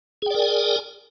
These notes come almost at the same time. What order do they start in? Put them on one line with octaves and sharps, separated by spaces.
G#4 G5 D5 A#4 G#5